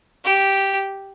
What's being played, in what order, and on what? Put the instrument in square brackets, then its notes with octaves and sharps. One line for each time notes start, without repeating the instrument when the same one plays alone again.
[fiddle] G4